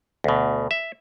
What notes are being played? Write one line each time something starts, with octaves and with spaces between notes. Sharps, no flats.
D2 B2
E5